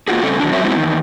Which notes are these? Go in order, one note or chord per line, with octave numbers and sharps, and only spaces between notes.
A#2 A#3 F4 F#4 G#4
C#3 G3 A3 C4 C#4 A4
D#3 F#3 D4
F#3 C4 F#4 A#4 C#5 E5
G#3 B3 C4 D#4 E4 F#4
E2 G#2 D#3